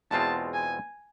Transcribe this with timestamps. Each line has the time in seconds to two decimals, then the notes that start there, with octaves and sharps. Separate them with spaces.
0.11 E2 B2 G#3 C4 F4 A5
0.54 G#5